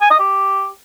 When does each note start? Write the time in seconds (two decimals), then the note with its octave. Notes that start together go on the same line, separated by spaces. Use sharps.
0.01 G#5
0.10 D#5
0.20 G4